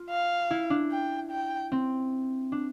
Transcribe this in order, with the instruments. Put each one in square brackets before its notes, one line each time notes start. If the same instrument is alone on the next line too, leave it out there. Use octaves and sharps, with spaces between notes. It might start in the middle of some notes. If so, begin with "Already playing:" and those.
Already playing: [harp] F4
[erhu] F5
[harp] E4
D4
[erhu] G5
G5
[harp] C4
D4